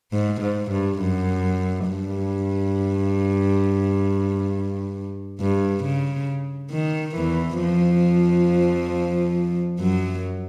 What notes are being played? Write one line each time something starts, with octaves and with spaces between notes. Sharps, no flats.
G#2
G#2
G2
F#2
G2
G2
C#3
D#3
E2 E3
F2 F3
F#2 F#3